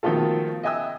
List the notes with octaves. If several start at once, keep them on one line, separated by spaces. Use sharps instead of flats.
B2 D#3 F3 A3 F4 A4
D#5 E5 G5 G#5 D#6 E6